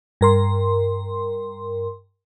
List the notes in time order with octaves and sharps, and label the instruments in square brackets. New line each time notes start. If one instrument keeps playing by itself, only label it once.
[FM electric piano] G2 A#4 C6